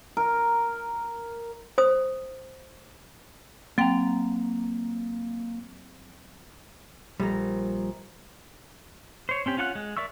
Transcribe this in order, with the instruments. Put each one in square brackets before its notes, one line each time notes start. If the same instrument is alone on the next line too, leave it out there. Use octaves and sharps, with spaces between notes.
[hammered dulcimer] A#4
[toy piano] C5 D#6
[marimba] F#3 C4 G5 [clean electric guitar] A#3 A#5
[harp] A#1 A#5 [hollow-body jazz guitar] G3
[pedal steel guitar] C5 C#5
C4 C#4 G4
C#4 F4 F#5 G#5 F#6
G#3
A#4 D5 E5 C#6 E6